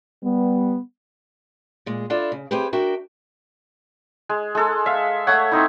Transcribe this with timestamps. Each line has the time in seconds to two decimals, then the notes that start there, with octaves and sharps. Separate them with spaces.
0.24 G3 B3
1.86 A#2 G#3
2.10 D4 E4 F4 A4 D5
2.32 C#3
2.51 C4 E4 G4 G#4 B4
2.73 D4 F#4 A#4 E5 G5
4.29 G#3
4.55 G#3 A4
4.86 E5 F5
5.27 A3 C#5 F#5
5.52 C4 D#4 E4